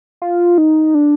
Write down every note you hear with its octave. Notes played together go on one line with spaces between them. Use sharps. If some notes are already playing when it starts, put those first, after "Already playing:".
F4
D#4
D4